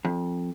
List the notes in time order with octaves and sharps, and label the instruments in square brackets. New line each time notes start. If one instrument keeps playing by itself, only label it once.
[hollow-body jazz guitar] F2